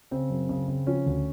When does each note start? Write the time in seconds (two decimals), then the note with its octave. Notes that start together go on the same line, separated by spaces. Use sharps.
0.11 C#3 C4
0.30 F#2
0.49 C#3
0.68 C#3
0.87 F3 C#4
1.06 D2